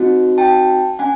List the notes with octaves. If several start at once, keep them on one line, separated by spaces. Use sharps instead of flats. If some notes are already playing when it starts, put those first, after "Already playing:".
Already playing: C4 D#4 F#4
G5 A5
C#4 F#5 G#5